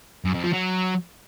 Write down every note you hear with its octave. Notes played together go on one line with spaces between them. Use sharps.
F#2
F2
F3
F#3